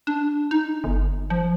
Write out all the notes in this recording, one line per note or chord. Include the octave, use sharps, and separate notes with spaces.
D4
D#4
G1
F3